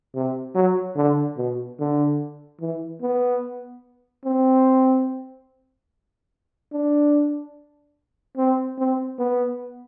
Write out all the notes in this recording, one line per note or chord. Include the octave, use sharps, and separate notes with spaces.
C3
F#3
D3
B2
D3
E3
B3
C4
D4
C4
C4
B3